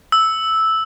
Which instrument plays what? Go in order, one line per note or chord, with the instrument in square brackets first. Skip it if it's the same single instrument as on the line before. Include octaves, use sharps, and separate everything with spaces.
[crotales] E6